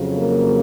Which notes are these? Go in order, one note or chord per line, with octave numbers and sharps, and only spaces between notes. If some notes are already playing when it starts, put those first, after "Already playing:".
Already playing: F2 C#3 F#3
A#3